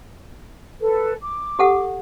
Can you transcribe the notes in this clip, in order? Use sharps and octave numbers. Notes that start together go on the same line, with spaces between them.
A4 B4
D6
G4 A4 F#5